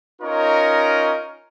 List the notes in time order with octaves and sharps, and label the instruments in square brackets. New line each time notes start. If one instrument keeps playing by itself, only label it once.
[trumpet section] C#4 D#4 F4 A#4 C#5 D#5